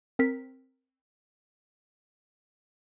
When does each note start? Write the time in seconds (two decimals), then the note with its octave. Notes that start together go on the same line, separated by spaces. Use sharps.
0.19 C4 A#4 B6